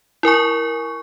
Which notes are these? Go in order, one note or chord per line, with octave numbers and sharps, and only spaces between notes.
E4 A#4 G#5 C#6